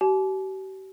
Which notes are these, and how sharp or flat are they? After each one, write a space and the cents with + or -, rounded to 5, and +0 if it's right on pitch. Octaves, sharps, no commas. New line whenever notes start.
G4 -40 G#5 +45